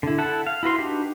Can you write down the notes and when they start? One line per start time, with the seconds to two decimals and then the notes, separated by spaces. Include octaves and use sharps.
0.03 D3 E4
0.18 E4 A4 F#5 A5
0.47 F5
0.63 E4 F#4 B4 C6
0.78 D4 D#4 F#4 G4 B4